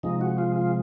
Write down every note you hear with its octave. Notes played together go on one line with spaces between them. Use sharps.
C3 F3 G#3 D#4
F#4
F4
F4